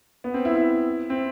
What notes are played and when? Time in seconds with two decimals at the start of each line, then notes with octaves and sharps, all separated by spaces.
0.24 B3
0.34 C4
0.45 E4
0.56 E4
1.10 C4